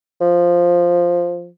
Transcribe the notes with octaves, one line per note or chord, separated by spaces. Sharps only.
F3